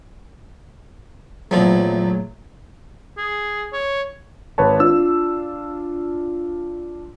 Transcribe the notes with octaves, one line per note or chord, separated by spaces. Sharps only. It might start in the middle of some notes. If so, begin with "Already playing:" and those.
E2 A#2 F3 F#3 A3
G#4
C#5
G#1 B4 C#5 A5
D4 F4 E6